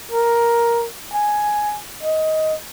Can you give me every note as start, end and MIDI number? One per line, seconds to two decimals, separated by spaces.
0.12 0.84 70
1.13 1.75 80
2.03 2.55 75